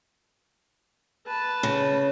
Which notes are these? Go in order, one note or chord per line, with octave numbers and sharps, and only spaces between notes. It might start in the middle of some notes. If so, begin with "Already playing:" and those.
B4 A5
C#3